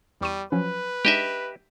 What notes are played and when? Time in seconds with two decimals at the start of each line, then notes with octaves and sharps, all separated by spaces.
0.21 E2 G3 C#6 D#7
0.52 F3 F#3 C#4 B4
1.05 G#3 D4 D#4 G4 D#5 E5